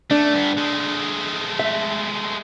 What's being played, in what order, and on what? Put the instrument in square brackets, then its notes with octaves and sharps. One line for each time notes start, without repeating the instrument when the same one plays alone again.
[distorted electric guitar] A3 [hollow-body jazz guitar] D4
[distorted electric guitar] G2 B3
G#3 A3
[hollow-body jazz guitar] E5